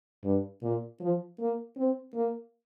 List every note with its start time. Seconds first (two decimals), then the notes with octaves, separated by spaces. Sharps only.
0.24 G2
0.62 A#2
1.01 F3
1.39 A#3
1.77 C4
2.15 A#3